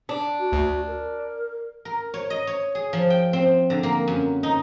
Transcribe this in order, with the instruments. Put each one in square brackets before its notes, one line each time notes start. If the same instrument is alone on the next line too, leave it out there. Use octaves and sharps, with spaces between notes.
[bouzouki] D4
[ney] F#4
[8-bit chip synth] D2
[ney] A#4
[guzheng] A#4
C#5
D#5
C#5
G#4
F3
G5
C4
D3
A#3
F#2
D#4